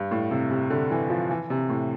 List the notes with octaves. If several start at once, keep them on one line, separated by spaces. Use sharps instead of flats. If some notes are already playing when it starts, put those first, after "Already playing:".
Already playing: G2
A2
C3
C3
D3
E3
F3
E3
C3
A2